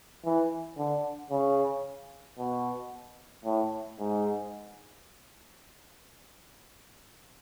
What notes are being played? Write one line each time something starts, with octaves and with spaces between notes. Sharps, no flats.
E3
D3
C#3
B2
A2
G#2